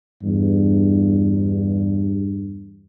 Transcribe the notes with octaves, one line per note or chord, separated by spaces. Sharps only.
E2 G2